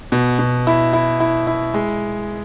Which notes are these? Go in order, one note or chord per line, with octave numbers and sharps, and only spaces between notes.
B2
B2
E4
E4
E4
E4
G#3